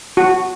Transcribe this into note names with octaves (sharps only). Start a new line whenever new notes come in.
F#4